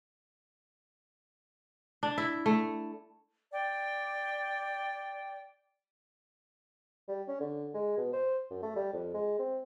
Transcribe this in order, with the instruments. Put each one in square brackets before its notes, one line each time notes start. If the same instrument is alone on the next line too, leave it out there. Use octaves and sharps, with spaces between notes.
[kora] D4
E4
A3
[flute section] D5 G5
[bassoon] G3
C#4
D3
G#3
B2
C5
F#2
A3
G3
F2
G#3
C4